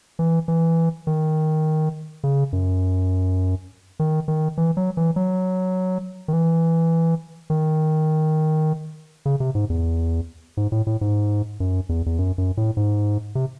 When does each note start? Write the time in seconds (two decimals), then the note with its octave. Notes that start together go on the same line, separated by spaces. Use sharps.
0.19 E3
0.48 E3
1.07 D#3
2.23 C#3
2.53 F#2
3.99 D#3
4.28 D#3
4.58 E3
4.77 F#3
4.97 E3
5.16 F#3
6.28 D#3
6.33 E3
7.50 D#3
9.26 C#3
9.40 C3
9.55 G#2
9.70 E2
10.57 G#2
10.72 A2
10.87 A2
11.01 G#2
11.60 F#2
11.89 E2
12.06 E2
12.18 F#2
12.38 F#2
12.57 A2
12.77 G#2
13.35 C3